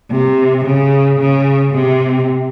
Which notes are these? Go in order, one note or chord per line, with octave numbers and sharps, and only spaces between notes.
C3
C#3
C#3
C3